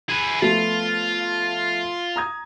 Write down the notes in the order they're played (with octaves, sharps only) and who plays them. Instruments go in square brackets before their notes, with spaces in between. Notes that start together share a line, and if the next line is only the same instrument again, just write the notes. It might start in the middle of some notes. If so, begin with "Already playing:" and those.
[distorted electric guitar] G#4 B4
[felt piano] F3 A3 B3 [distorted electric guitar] F4
[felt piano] A#5 D#6 G#6